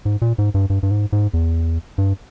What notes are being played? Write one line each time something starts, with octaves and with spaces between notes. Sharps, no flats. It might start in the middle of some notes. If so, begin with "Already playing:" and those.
G#2
A#2
G#2
G2
G2
G2
G#2
G#2
E2
G2